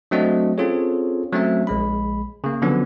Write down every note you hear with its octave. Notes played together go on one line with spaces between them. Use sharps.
F#3 A3 C4 D4 F#4 D#5
C4 C#4 F4 G#4 A4 C#5
F#3 A3 C4 C#4 E5
A#1 G#3 B5
C#3 A#3
D3 F3 F#3 B3 C#4 D4